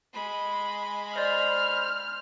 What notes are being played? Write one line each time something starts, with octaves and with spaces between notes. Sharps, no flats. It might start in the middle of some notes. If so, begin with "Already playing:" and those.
G#3 B5
C5 D5 D#5 F6